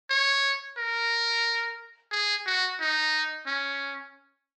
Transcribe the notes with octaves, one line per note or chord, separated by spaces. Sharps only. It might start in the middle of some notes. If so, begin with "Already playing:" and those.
C#5
A#4
G#4
F#4
D#4
C#4